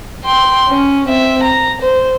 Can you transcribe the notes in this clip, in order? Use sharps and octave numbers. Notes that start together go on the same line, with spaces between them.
G5 C6
C#4
C4 E5
A#5
C5